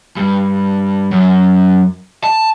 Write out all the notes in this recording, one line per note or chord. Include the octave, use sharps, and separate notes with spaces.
G2
F#2
A5